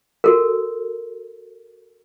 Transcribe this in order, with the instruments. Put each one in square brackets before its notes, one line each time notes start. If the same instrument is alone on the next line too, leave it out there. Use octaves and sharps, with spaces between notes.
[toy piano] F#4 A4 A#4